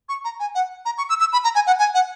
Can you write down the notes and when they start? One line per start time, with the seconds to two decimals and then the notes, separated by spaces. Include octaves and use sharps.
0.09 C#6
0.25 A#5
0.40 G#5
0.55 F#5
0.85 A#5
0.98 C#6
1.09 E6
1.20 E6
1.33 B5
1.44 A#5
1.55 G#5
1.67 F#5
1.79 G#5
1.94 F#5